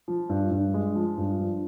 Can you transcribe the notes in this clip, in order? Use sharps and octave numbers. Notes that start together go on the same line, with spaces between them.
F3
G2
G2
G#3
F3
G2
F3